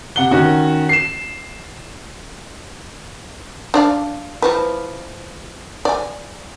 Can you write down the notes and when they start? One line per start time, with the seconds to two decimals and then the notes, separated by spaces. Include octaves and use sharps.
0.16 C3 F#5 G7
0.31 D#3 C#4 F#4
0.89 C7 E7
3.74 D4 D5 F5
4.42 E3 F3 B4
5.85 D5 G#5